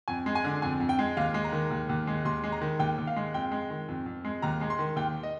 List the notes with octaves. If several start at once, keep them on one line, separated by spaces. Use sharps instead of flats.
F2 G#5
G#3
G#5
D3
F2 G#5
F2
G5
G#3
D#2 F5
G#3
A#5
D#3
D#2
D#2
G#3
D#2 C6
G#3
A#5
D#3
D#2 G5
D#2
F5
G#3
F2 G5
G#3
D#3
F2
F2
G#3
D#2 A#5
G#3
C6
D#3
D#2 G5
D#5